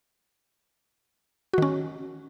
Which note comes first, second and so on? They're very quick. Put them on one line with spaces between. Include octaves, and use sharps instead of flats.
F#4 D#3 C#4